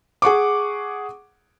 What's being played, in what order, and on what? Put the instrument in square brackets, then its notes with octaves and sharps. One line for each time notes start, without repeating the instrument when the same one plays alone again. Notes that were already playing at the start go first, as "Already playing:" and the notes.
[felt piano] G#4 F#5 C#6 D6